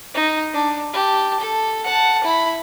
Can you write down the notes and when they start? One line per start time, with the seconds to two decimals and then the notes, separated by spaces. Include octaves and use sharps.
0.14 D#4
0.54 D4
0.93 G4 A5
1.40 A4
1.84 F#5 A5
2.24 E4 B5